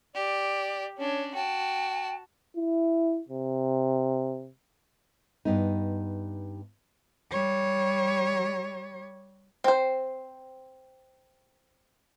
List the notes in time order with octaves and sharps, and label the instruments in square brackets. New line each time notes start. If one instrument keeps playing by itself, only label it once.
[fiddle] G4 [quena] D5
[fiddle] C#4 D4 [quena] C#5
[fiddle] F#4 A5 [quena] G5
[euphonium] E4
C3
[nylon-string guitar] G2 B3 D#4
[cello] G3 C#5
[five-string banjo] C4 C5